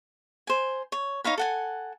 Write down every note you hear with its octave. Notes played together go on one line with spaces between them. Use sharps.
C5 G#5
C#5
D#4 C#5 F5 B5
A4 F#5 G#5